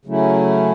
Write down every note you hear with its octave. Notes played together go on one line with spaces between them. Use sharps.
C#3 F#3 A3 C#4 E4